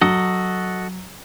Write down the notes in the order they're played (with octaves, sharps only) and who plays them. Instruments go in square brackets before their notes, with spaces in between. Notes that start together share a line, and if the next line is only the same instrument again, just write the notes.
[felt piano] F#3 [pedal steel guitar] F#4 A4 D#5